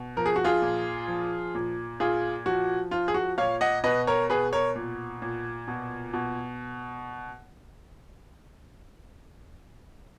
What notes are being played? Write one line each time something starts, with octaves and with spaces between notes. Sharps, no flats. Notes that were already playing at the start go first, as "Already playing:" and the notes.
Already playing: B2
F3 A#4
G#4
F#4
F4 G#4
A#2
F3
A#2
A#2 F4 G#4
F3 F#4
F3 F4
G#4
F#4
A#2 C#5 F5
D#5 F#5
B2 B4 D#5
A#4 C#5
B2 G#4 B4
A#4 C#5
A#2
A#2
B2
B2